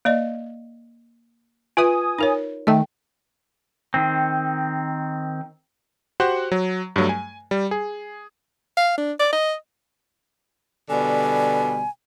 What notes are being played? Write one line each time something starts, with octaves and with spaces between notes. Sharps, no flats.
A#3 D5 D#5
F4 B4 E5 G#5 D#6
D#4 A#4 C#5
D#3 A3 E5 G5
D#3 C4
F#4 G4 C5 F#5
F#3
G2 F#3 A3
G#5
G3
G#4
F5
D4
D5
D#5
B2 D3 G3 G#5